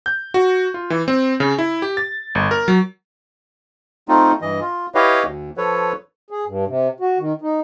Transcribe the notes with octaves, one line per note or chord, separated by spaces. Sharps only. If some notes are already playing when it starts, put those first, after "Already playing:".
G6
F#4
F4
E3
C4
C#3
E4
G4
A6
G1
A#4
F#3
A3 C4 D#4 F4
G2 E3 D#5
F4
E4 G4 B4 C#5 D#5 F5
D2
F3 A4 B4 C#5
G#4
G2
C3
F#4
D#3
D#4